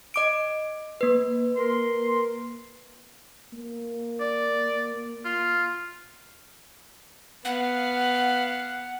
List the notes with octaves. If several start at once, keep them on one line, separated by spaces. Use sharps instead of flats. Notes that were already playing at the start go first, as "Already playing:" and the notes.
D#5 D6 D7
A#3 B4
A#4 C6
A#3
D5
F4
B3 F5 F#5